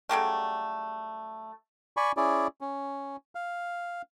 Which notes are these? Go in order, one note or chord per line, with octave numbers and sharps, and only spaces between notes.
C#3 F#3 G3 A3
D5 G#5 B5 C#6
C#4 E4 G#4 D5
C#4
F5